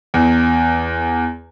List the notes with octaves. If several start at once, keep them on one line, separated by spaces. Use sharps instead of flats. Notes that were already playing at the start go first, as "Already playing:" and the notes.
E2